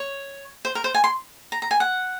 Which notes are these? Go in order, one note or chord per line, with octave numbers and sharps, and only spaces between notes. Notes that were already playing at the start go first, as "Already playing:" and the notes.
Already playing: C#5
C5
A#4
C5
G#5
C6
A#5
A#5
G#5
F#5